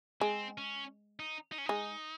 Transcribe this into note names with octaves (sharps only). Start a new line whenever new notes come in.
G#3 C4
C#4
D#4
D#4
C#4
G#3 D#4